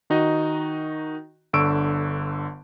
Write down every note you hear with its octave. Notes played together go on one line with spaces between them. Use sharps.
D#3 D#4 F#4 D#5
G1 D3 C#6 E6 D7